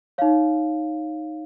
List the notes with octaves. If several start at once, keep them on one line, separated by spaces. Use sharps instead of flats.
D#4 C#5 F5